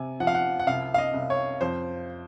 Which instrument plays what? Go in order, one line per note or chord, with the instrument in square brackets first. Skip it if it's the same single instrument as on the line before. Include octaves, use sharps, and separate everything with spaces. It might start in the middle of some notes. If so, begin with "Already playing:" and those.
Already playing: [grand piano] C3 G#5
F3 F#5
F5
F#5
F#5
C2 F5
F5
D#5
C2
C#5
F2 C5